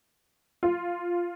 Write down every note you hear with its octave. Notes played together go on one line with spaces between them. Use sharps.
F4